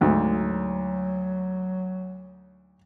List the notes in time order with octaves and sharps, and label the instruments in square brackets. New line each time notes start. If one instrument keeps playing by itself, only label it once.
[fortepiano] D2 G#2 [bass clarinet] F#3